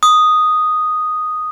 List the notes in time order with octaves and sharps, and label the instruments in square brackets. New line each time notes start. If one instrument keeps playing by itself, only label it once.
[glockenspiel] D#6